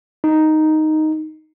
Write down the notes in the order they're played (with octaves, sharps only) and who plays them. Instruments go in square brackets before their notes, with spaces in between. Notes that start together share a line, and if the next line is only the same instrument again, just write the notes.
[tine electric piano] D#4